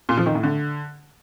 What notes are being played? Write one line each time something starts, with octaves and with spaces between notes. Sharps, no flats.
A#2
F3
D#3
A2
D3